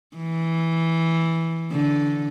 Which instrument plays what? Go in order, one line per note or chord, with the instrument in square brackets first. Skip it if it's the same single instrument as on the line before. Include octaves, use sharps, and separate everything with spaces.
[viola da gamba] E3
D3